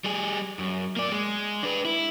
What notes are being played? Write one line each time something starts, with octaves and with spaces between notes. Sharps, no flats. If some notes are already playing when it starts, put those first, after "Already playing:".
G3 G#4
F#2
A#3 D5
G#3
D4 B4
E4